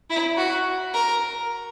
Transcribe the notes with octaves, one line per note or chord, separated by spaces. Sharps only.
E4
F#4
A#4